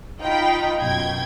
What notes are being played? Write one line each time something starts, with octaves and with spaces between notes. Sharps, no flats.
D#4 F4 G5 B5
F#2 B2 G5 G#6